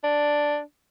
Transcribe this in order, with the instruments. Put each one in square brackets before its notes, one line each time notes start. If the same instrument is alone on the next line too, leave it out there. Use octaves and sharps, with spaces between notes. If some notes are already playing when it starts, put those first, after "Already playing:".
[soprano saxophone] D4